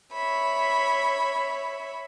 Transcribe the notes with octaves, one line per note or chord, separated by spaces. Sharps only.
C#5 E5 B5